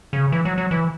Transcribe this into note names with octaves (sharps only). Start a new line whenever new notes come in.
C#3
E3
F#3
F#3
E3